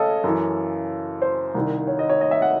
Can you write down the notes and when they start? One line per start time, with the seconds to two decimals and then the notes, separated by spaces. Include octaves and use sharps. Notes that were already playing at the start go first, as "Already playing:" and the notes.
Already playing: C#3 A4 C#5 D#5
0.24 F#2 E3
1.22 C5
1.54 C2 C3 D#3
1.87 C#5
1.99 D#5
2.09 C#5
2.21 D#5
2.31 E5
2.42 F#5